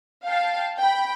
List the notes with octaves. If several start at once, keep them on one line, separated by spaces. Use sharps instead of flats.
F5 G5 A5
G5 B5